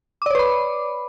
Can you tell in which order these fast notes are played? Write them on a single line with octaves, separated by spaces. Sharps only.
D6 D5 C#5 B4 B5